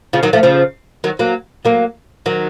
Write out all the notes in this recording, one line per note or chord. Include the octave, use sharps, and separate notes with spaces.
C#3 F3
D#3 F#3
F3 A3
C#3 F3
D#3 F#3
F#3 A#3
F#3 A#3
D#3 F#3